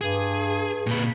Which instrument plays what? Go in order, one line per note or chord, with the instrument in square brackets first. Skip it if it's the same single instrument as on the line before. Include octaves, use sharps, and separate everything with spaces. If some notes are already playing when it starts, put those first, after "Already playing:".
[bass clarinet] G2 [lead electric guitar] G#4
[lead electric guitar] A#2 B4